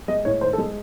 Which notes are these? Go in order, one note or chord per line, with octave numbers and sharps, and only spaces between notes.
G#3 D#5
A2 C#5
D#3 C5
A4
G#3